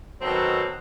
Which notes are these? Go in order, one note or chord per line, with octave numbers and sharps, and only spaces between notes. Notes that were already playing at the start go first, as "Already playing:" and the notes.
B2 D#3 F#3 C4 A4 A#5